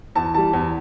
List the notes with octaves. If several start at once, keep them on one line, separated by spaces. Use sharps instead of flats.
E2 A5
E3 G3 A5
E2